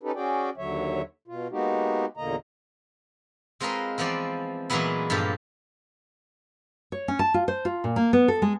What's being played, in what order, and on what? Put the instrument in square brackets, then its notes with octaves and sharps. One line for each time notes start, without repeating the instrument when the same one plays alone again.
[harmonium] C#4 D#4 G4 A4 B4
C#4 F#4 G#4 D5 G5
D#2 D3 F#3 C#5 E5
B2 F4
G#3 A#3 B3 D#4 F#4 G4
E2 A#2 D3 A#3 D#5 A#5
[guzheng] G#3 C4 F4 A#4 B4 D#5
E3 F3 B3 C4 D5
A#2 E3 F#3 G#3 B3 E4
G2 A#2 F3 G4 A4
[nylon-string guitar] C#5
C#4
A5
F4
C5
F4
A#2
A#3
B3
A4
G#3